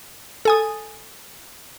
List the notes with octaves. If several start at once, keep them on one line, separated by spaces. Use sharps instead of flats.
A4 G#5 D#6